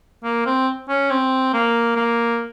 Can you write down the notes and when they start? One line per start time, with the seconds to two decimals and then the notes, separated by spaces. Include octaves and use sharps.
0.24 A#3
0.46 C4
0.89 C#4
1.11 C4
1.54 A#3
1.96 A#3